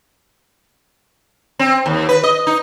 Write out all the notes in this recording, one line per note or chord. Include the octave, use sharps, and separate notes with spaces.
C4
D#2
B4
D#5
D#4